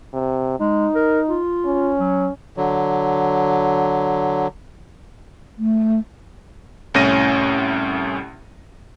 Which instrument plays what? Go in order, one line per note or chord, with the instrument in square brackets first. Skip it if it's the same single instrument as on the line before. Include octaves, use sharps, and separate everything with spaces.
[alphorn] C3
[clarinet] G#3 [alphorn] D#4
[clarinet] A#4
F4
[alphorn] C#4
[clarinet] F#3
[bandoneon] D3 F#3
[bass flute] A3
[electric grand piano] C2 A2 C#4 A#6 D#7